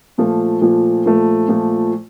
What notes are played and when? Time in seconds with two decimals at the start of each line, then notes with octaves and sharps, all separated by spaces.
0.18 A#2 F3 A3
0.61 A#2 F3 A3
1.05 A#2 F3 A3
1.48 A#2 F3 A3